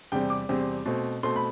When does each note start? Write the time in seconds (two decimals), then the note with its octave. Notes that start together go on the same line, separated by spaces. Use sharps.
0.12 E2 C3 G3 C4 G5
0.30 D6
0.49 E2 C3 G3 C4
0.86 B2 A3 C4
1.23 B2 A3 C4 C6
1.36 B5